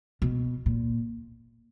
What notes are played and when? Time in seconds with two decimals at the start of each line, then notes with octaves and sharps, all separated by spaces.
0.22 B2
0.66 A#2